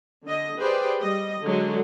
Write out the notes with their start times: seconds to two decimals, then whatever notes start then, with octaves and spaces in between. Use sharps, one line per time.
0.23 D3 D#5
0.58 G4 G#4 B4 C5 D5 G5
1.01 G3 D#5
1.44 D3 F#3 G#3